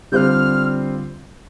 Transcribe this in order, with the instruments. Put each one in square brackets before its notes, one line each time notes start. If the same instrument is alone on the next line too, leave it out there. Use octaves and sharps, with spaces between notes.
[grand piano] D3 G3 C4 F4 C5 [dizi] F6 G6